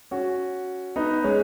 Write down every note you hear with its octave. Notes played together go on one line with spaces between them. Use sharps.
C#4 F#4
B3 D#4
G#3 C#4